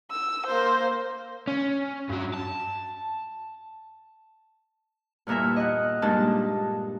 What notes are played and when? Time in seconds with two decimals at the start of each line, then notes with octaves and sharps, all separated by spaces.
0.11 E6
0.46 A#3 C5
1.47 C#4
2.09 G2 F#3
2.34 A5
5.27 E2 G2 A#2 A#4 E5
5.56 D#5 F#5
6.02 G2 A#2 G#3 D4 D#4 A5